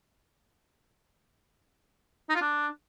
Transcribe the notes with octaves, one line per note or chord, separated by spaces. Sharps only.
D#4
F4
D4